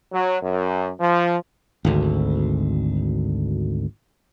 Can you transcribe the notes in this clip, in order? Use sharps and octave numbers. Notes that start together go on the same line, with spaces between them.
F#3
F#2
F3
G#1 D2